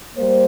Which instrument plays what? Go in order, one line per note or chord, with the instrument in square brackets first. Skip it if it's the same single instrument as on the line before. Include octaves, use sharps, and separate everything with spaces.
[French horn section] G3 A#3 C5